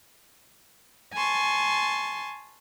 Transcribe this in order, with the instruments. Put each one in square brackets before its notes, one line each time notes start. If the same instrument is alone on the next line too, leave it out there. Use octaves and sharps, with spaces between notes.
[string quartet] G#5 A5 C6 C#6